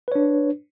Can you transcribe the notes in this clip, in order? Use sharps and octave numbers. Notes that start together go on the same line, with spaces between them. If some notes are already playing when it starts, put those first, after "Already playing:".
D4 B4 C#5